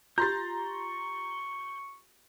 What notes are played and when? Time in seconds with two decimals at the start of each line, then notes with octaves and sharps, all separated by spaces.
0.18 F4 G4 A#5 C6 G6 A6
0.58 C#6